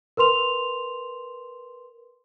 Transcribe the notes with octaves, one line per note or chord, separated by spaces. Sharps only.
A#4 B4 C6 F7